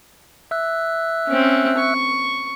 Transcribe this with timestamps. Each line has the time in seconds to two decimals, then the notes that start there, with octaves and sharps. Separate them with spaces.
0.51 E5 E6 F#6
1.28 C4 C#4
1.78 C#6